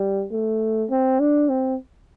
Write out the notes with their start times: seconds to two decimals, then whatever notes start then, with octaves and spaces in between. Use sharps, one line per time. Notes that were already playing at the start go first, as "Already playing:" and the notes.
Already playing: G3
0.32 A3
0.91 C4
1.20 D4
1.50 C4